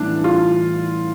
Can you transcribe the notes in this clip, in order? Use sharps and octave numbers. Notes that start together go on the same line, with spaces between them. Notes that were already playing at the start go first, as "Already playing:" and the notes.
Already playing: A2 E3 G3 B3 D4
F4